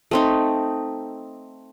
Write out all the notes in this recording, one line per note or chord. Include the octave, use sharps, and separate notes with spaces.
A3 C4 D#4